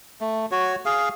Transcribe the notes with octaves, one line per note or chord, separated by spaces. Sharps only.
A3
F#4 C#5
G#4 F5